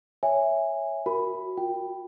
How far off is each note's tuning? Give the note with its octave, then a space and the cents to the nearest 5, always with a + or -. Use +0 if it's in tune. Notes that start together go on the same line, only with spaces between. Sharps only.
C#5 +0 E5 +0 G#5 -15
F#4 +0 A#4 +0 B5 +0
F4 +30 G5 +0